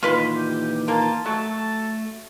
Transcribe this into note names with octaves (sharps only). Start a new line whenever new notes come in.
A#2 D#3 E3 F4 B4 C6
G4
A#3 F4 A5
F#3 A3 A4